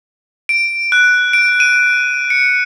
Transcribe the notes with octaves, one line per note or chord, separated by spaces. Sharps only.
D7
F#6
D7
D#7
C#7